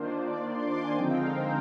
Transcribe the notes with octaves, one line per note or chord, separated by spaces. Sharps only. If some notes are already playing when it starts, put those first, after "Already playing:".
Already playing: D#3 A#3 D4 F4 C5
D5
C6
D6
C6
G#5
D3 F3 G#3 C4 D#4 G5
F5
A#4
C5